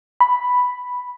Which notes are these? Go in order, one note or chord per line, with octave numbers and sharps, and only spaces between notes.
B5